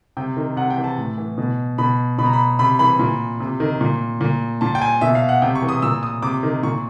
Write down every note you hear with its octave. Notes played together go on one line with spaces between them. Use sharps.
C3 G5
D#3
C3 F#5
G5
E3
A5
A2
E3
B2
B2 B5
B2 B5
A#5
B5
C3 B5
E3 B5
A#2
C3
D#3
A#2
A#2
A#2 A5
G5
G#5
B2 E5
F5
F#5
C3 G5
C#6
E3
D#6
A#2 E6
D#6
C3 D6
D#3
A#2 C#6